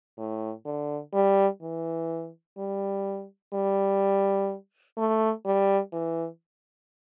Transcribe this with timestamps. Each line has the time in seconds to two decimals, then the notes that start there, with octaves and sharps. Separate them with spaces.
0.18 A2
0.65 D3
1.13 G3
1.62 E3
2.58 G3
3.53 G3
4.97 A3
5.45 G3
5.93 E3